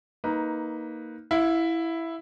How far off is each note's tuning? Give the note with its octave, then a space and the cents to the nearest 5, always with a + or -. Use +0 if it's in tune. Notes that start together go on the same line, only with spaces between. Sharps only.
A#3 +0 D#4 +15 B4 +0
E4 +0 F5 +35